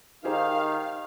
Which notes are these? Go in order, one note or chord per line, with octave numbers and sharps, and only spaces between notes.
D#3 D#4 G4 G#4 C5 F5